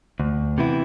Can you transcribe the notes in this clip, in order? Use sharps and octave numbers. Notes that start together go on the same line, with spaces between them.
D2
C3 E3 B3 E4